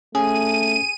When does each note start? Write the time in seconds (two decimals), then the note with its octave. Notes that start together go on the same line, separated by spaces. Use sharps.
0.15 A3 C#4 G#4 D#7